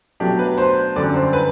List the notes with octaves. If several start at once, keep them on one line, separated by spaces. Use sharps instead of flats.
B2 F#3 A3 D4 G4
B4
C5
F#2 D3 G3 D5
C5
B4